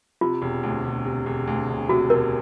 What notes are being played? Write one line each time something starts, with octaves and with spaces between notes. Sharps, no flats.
C3 F4
E1
D2
E1
C3
E1
D2
E1
C3 F#4
E1 A#4